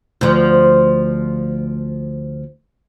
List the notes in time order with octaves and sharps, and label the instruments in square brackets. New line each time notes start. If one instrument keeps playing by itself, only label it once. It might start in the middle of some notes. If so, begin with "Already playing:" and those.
[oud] D2 F3